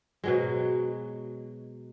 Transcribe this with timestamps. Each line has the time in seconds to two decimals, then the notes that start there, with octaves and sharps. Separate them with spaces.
0.24 B2 F#3 G#3